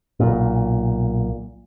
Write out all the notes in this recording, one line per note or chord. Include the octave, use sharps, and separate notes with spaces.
B1 A#2